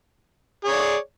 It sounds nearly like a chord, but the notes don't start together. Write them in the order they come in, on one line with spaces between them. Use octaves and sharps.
G#4 C#5 D5